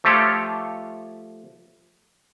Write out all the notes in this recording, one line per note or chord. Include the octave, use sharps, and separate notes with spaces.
F3 A3 F4 G4 A4 C#5